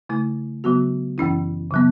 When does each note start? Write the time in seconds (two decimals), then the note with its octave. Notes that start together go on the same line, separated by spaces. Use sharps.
0.09 C#3 A3 E4
0.64 C#3 F#3 B3 F#4
1.18 F#2 E3 C#4 E4
1.71 C#3 F#3 B3